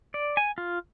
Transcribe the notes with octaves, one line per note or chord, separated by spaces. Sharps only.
D5
G#5
F4